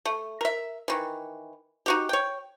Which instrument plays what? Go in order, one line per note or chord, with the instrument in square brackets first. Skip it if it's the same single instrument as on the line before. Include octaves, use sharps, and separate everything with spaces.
[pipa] A3
A#4 E5
D#3 E3
D#4 F#4 G4
C#5 G5